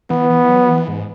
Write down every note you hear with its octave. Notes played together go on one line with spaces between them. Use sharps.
E3 B3
E3
F#3
E3
G#2